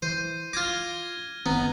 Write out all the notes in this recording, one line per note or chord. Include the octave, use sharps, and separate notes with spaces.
E3 C5 D#7
F4 D6 F6 G#6 A#6
F#1 D#3 B3 C4 A#5